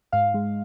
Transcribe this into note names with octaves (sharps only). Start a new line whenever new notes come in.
G#2 F5
G#3